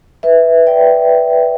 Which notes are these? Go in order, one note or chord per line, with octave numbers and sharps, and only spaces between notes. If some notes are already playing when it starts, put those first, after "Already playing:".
B4 E5
D5 G5